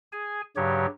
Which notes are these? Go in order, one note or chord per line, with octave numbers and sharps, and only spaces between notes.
G#4 G#5
G2 C#3 F#3 G4 C#5